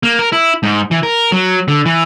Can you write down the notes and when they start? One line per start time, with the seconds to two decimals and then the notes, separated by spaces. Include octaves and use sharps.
0.03 A#3
0.19 A#4
0.32 E4
0.63 G#2
0.91 E3
1.03 A#4
1.32 F#3
1.68 D3
1.86 E3